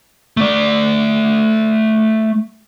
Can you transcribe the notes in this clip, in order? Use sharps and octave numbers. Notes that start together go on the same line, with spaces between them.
A3 D5